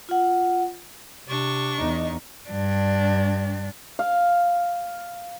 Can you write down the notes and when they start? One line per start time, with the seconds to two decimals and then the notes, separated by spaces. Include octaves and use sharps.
0.09 F4 F#5
1.28 C3 D4 C#6
1.78 E2 D#4
2.50 G2 D4
3.99 F5